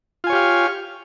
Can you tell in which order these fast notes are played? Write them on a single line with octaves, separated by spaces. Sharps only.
F4 G#5 C#5 G4 F5